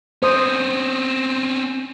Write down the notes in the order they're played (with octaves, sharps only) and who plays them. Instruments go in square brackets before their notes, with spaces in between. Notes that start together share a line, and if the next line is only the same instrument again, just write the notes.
[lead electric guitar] C4 C#4 [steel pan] C5 D#6